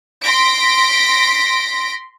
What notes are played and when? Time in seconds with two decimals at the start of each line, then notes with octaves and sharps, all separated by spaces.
0.23 C6 A#6 B6 D7